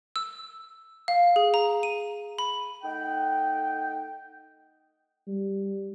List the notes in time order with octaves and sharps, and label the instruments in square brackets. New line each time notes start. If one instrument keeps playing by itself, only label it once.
[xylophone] E6
F5
G#4
A#5
D#7
B5
[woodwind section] A3 D#4 D#5 F#5 G5
[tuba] G3